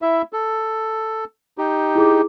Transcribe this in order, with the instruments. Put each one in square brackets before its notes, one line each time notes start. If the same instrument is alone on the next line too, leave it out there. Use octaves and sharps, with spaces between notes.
[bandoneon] E4 E5
A4
D#4 G4
[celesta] E4 G#4 D6